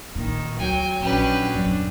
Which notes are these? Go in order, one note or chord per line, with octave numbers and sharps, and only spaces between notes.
A#2 D#3
D2 F#3 G5 G#5
A#1 F#3 C#4 D4 G4 B4
D#1 F#2 D4